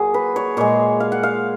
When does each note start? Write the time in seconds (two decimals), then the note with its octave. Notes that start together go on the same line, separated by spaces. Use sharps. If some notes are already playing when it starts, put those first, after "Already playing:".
Already playing: A#2 F#3 F#4 G#4
0.14 B4
0.36 C#5
0.57 A#2 G#3 C#5
1.00 F5
1.12 F#5
1.23 F5